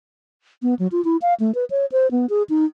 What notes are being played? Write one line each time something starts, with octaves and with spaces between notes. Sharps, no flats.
B3
F#3
F4
E4
F5
A3
B4
C#5
C5
B3
G#4
D#4